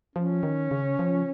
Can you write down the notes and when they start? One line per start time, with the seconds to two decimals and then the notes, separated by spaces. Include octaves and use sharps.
0.15 F3 C#4
0.43 D#3
0.71 C#3
0.99 F3